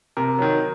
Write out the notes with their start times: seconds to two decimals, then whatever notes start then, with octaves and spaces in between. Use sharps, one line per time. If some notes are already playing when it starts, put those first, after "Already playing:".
0.17 C3 A#4
0.39 D#3 F#3